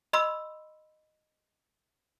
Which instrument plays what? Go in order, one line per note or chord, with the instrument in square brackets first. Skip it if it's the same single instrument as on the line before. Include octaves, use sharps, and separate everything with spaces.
[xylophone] D#5 B5 C6 E6